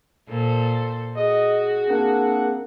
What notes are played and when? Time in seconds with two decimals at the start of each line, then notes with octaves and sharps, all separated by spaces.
0.29 A#2 A4 C5
1.17 F#4 G#4 D#5
1.89 A#3 C4 D4 F#5